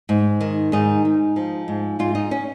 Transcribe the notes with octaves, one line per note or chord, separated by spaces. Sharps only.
G#2
D#3
G#2 D#4
G#2
F3
G#2
G#2 F4
D#4
C#4